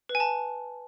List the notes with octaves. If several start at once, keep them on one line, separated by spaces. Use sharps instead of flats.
B4
G#5
A5